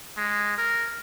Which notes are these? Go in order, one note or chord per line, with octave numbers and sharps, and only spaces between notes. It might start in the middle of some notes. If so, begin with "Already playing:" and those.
G#3
A#4